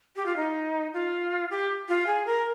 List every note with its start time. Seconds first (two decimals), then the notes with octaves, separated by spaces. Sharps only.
0.16 G4
0.26 F4
0.36 D#4
0.93 F4
1.50 G4
1.89 F4
2.07 G#4
2.26 A#4